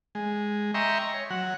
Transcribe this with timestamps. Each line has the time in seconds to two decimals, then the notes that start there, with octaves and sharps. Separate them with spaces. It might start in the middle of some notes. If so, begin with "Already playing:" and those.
0.15 G#3
0.74 D#5 E5 G5 A#5 C6 C#6
1.14 C#5
1.30 F#3 F#5